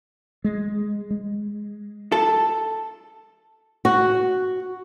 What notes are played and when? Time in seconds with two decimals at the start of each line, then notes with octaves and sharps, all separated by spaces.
0.44 G#3
1.10 G#3
2.12 A4
3.85 F#4